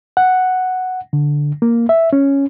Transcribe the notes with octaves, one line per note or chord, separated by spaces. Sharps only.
F#5
D3
A#3
E5
C#4